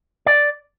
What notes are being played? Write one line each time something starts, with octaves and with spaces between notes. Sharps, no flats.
D5